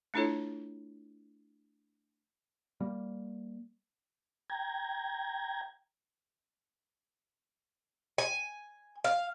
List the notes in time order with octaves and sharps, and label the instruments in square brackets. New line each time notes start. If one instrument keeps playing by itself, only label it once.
[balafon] A3 D4 E4 F4 A4 C#5
[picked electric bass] G3 A#3
[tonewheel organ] G5 A#5 G#6
[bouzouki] G#5
F5